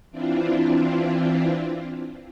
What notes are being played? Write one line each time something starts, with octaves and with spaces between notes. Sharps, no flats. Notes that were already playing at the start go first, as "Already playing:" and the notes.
E3 C4 D4 E4 F4